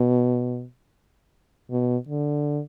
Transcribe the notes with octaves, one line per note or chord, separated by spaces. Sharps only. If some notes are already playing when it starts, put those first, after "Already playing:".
Already playing: B2
B2
D3